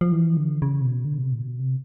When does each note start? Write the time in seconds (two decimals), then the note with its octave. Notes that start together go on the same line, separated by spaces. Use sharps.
0.01 F3
0.12 E3
0.37 D3
0.62 C#3
0.81 C3
0.85 B2
1.05 D3
1.18 B2
1.23 C3
1.33 A#2
1.41 B2
1.60 C3